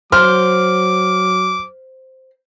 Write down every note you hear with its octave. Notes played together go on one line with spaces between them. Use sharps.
F#3 C5 D6 F6